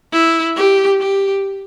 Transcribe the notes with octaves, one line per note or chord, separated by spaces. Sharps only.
E4
G4
G4